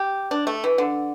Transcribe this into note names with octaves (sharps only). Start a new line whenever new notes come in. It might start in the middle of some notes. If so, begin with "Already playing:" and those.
Already playing: G4
D4
A3
E3
D3